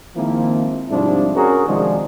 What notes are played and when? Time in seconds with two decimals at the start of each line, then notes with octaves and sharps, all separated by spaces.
0.16 D#3 F3 G#3 A#3 C4 E4
0.91 G#2 C3 F3 G3 D4 E4
1.35 C#4 F#4 G#4 A#4
1.67 C3 D#3 F3 G#3 D4